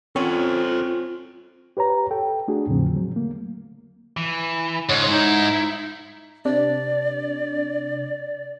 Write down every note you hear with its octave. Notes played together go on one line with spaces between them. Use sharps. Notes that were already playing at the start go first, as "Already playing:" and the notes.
F#3 C4 C#4 F4 A4 C5
G4 B4 C#5 A#5
A4 G5
A3 D4 F#4 G#4
E2 A2 C#3 F3 C4
D3 F#3
A3 A#3
E3
C#2 G#2 C#5
D#4 E4
C3 D4 D5